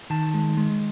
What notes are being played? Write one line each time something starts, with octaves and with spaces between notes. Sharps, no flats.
D#3 A5
G#3
G#3